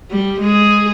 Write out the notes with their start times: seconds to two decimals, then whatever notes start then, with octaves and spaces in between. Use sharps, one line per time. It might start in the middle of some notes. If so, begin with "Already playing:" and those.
0.10 G3
0.41 G#3 G#4